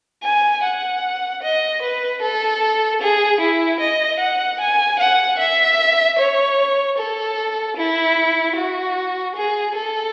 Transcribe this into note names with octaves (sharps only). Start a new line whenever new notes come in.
G#5
F#5
D#5
B4
A4
G#4
E4
D#5
F#5
G#5
F#5
E5
C#5
A4
E4
F#4
G#4
A4